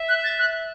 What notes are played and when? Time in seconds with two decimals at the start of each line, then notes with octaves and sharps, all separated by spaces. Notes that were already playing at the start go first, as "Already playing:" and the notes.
Already playing: E5
0.09 F#6
0.24 A6
0.39 F#6